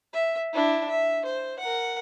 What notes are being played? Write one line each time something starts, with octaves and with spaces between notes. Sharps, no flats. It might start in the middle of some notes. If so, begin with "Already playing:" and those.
E5
D4 E4
E5
C5
A#4 F#5